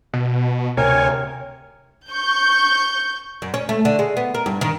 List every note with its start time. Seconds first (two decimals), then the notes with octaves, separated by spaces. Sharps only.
0.13 B2
0.77 D2 C3 A#4 C#5 G#5
2.10 C#6 G6
3.42 F#2
3.54 C#4
3.69 A3
3.85 D3
3.99 G#3
4.17 B3
4.34 A#4
4.46 G2
4.61 D#3